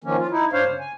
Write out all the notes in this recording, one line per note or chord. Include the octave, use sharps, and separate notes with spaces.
D#3 F3 A#3 C#4
F4
D#4 E4
G2 D4 C5 C#5 F5
C#3
G#5